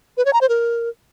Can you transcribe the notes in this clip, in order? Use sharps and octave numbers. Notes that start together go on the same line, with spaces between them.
B4
C#5
A#5
C5
A#4